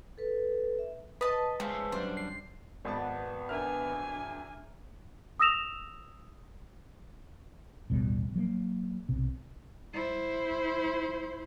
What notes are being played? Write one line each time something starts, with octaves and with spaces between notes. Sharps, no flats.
A4 B4
E5
B4 D#5 A5
G#3 A3 C#4 C5 F5
F#2 G3 D4 C5
C7
G#1 B3 D5 A5
D4 A#4 E5 G#5 F6
D#6 E6 A#6 E7 F7
A1 D#2 B2 G3
F#3 G#3 A#3
B1 C3
E4 C5